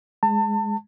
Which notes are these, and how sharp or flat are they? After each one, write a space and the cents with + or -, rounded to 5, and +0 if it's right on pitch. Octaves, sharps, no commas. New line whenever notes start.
G#3 +0 A5 +30